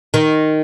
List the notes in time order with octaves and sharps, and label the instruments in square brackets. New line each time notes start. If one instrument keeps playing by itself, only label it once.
[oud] D#3